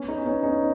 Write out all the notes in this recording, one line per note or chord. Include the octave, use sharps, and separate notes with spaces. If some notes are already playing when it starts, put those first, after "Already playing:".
Already playing: B3 C#4
D#4
B3 C#4
D#4